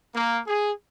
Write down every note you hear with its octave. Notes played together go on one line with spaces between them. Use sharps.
A#3
G#4